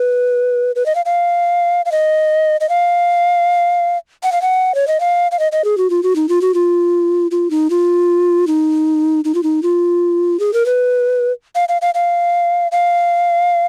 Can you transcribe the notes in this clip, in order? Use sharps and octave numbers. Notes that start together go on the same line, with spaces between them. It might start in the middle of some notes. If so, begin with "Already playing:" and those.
Already playing: B4
B4
D#5
F5
F5
F5
D#5
D#5
F5
F#5
F5
F#5
C#5
D#5
F5
F5
D#5
D#5
G#4
F#4
F4
F#4
D#4
F4
F#4
F4
F4
D#4
F4
D#4
D#4
F4
D#4
F4
G#4
A#4
B4
F5
F5
F5
F5
F5